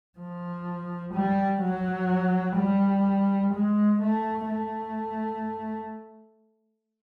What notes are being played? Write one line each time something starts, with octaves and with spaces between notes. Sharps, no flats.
F3
G3
F#3
G3
G#3
A3
A3